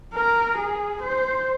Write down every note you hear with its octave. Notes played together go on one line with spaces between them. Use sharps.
A#4
G#4
C5